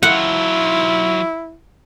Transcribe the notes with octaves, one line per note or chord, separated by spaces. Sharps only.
F#3 E4 F4 F#5